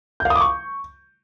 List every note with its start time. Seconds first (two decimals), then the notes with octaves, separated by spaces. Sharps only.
0.20 G6
0.25 F5
0.30 D#6
0.35 D6
0.41 C#6